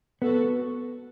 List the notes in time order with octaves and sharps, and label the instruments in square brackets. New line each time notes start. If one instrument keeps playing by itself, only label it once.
[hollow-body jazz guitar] B3 [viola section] F#4 A4